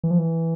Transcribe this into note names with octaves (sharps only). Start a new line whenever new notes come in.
E3
F3
E3